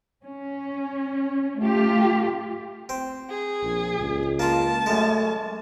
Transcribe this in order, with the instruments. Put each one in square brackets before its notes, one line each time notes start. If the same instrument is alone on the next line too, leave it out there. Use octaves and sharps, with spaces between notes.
[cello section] C#4
A3 F4 G4
[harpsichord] C4
[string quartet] G#4
[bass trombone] A#1
C#2
[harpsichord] A#3 F4 [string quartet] A5
[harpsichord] F#2 G#3 [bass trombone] A3